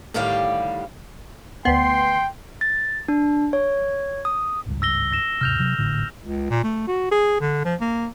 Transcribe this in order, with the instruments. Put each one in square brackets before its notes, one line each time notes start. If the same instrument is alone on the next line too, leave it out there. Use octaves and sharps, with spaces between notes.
[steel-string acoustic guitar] A2 D3 D#3 G3 G4 F5
[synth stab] D2 B3 [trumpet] G5 [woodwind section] C6
[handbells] A6
D4
C#5
D#6
[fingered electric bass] G#1 C#2 G2
[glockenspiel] E6 A#6 G7
A#6 E7
[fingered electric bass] D#2 G#2 C3 [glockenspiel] F6 G6 F7
[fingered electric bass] C3 F#3
G#1 A2 D3
[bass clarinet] C#2
A#2
A3
F#4
G#4
D3
F3
A#3